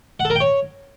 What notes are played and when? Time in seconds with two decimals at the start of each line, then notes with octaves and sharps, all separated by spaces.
0.20 F#5
0.25 A4
0.30 A#4
0.35 G5
0.40 C#5